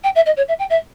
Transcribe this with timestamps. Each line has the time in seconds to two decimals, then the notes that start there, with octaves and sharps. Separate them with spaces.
0.03 G5
0.15 E5
0.25 D#5
0.36 C#5
0.48 E5
0.58 G5
0.70 E5